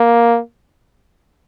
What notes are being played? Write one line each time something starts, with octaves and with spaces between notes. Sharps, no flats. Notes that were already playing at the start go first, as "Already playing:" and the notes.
Already playing: A#3